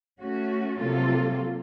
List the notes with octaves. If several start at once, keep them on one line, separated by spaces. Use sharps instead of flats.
A3 C#4 F#4
C3 F#3 A#3 F4 A4